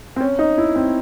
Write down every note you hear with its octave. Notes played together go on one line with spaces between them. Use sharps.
C4
C#4
D#4
E4
C4